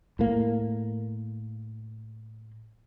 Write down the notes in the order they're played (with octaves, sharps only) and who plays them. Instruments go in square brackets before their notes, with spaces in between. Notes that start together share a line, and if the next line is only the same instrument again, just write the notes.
[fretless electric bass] A2 A#3